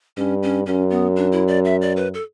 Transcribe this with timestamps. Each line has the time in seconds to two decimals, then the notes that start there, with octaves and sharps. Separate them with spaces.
0.17 G2 C#4
0.43 C#4
0.66 F#2 C#4
0.90 B3
1.16 D4
1.32 E4
1.48 D5
1.65 E5
1.81 D5
1.97 B4
2.14 A4